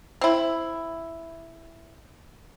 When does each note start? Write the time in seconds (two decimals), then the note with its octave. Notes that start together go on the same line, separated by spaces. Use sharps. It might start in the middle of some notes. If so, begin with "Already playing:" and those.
0.21 C4 E4